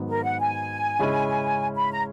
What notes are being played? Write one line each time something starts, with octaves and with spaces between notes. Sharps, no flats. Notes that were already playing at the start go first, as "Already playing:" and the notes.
Already playing: G#2 D#3 F#3 B3
A#4
F#5
G#5
C#3 G#3 C#4 E4
B5
A#5